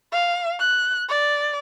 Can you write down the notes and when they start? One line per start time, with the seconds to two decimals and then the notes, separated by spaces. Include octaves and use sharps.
0.12 F5
0.60 F#6
1.09 D5